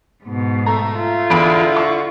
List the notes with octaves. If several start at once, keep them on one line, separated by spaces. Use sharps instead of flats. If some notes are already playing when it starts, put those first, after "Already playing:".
G#2 B2
A3 A#5
F4
E2 D3 E4 B5 D7
C#6